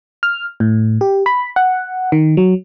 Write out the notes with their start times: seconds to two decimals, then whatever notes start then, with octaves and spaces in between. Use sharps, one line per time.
0.23 F6
0.60 A2
1.01 G4
1.26 B5
1.56 F#5
2.12 D#3
2.37 F#3